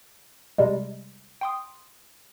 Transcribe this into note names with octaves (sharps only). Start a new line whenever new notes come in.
C3 G3 G#3
G5 C6 D#6